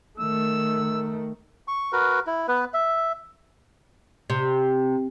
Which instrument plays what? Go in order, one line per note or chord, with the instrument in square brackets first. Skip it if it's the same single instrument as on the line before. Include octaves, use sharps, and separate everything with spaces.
[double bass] D#3 A3 [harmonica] E6
[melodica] C#6
F#4 A#4 B4
E4
B3 B4
E5
[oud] C3